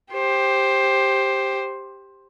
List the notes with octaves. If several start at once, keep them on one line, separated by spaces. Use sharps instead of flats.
G4 C5